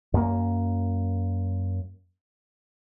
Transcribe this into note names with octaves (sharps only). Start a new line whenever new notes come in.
F#2 A#3